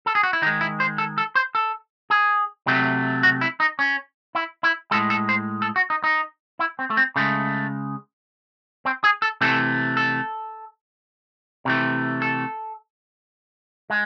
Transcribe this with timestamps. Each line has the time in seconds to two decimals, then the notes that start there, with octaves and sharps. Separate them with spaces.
0.06 A4
0.15 G#4
0.23 F#4
0.33 E4
0.42 D#3 D#4
0.46 G#3
0.61 E4
0.80 C5
0.98 A4
1.18 A4
1.35 C5
1.55 A4
2.10 G#4
2.67 C3 F#3 A3
3.23 F#4
3.41 E4
3.60 D#4
3.79 C#4
4.35 E4
4.63 E4
4.91 A2 G#3 A4
5.10 A4
5.29 C5
5.62 A4
5.76 F#4
5.90 D#4
6.04 D#4
6.59 E4
6.79 C4
6.90 A3
6.97 C4
7.16 C#3 G#3 A3
8.85 C4
9.04 G#4
9.22 A4
9.41 C3 E3 A3 A4
9.97 A4
11.65 C3 E3 A3
12.22 A4
13.90 G#3